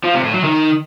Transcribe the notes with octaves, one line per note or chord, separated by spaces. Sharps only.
F3
C3
A2
F#3
D#3